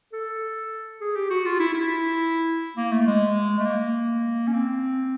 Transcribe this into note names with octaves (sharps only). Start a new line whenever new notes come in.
A4
G#4
G4
F#4
F4
E4
E4
A#3
A3
G#3
A3
A#3
C#4
C4